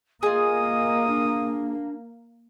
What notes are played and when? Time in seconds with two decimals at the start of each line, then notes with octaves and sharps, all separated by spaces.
0.23 A#3 F4 G#4 D#5 D#6
1.07 D4